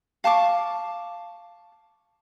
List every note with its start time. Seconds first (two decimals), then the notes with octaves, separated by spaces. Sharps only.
0.24 F5 A5 C#6 D6